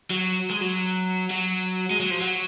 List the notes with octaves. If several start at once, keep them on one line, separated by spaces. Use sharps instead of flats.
F#3
G#3
F#3
F#3
G#3
F#3
F3
F#3